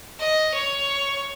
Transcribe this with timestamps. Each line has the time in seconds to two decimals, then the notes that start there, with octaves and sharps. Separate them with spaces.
0.20 D#5
0.55 C#5